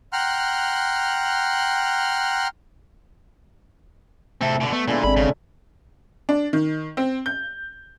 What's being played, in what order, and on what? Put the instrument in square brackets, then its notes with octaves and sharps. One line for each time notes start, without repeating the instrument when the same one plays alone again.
[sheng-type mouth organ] F#5 G5 A#5 C6 F6 F#6
[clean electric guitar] A2 C3 E5 [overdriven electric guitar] C4 A4
[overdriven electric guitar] B2 D3
[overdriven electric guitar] A3 [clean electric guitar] B3
[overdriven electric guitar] A#2 [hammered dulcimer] D3 G#3 E4
[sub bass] G#1 [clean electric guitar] C4 G#4 [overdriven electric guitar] B5
[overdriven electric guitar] C#3
[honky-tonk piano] D4
D#3
C4
G6